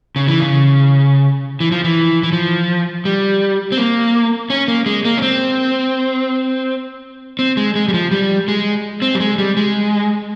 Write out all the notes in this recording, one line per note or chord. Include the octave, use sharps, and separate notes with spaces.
C#3
E3
C#3
E3
F3
E3
E3
F3
G3
C4
A#3
C#4
A#3
G#3
A#3
C#4
C4
C4
G#3
G#3
G3
F3
G3
G#3
C4
G3
G#3
G3
G#3